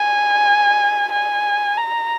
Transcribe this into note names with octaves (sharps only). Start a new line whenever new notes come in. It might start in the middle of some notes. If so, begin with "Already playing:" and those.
Already playing: G#5
G#5
A#5